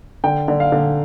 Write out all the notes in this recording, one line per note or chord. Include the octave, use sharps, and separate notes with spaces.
D3 G5
D3
F5
D3